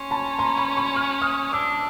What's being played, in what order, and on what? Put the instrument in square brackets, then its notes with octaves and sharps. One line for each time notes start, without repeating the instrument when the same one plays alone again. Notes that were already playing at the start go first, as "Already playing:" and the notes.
Already playing: [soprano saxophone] C#4 [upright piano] C6
[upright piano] A5 B5
A#5 C6
B5 C#6
B5 C#6
F6
D#6 F6
[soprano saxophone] D4 [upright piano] D6 E6